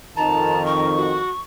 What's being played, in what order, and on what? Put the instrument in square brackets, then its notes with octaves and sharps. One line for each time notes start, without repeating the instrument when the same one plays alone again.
[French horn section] F2 D#3 [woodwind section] A5 [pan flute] A#5
[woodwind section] A#4 [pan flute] C#6
[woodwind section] F#4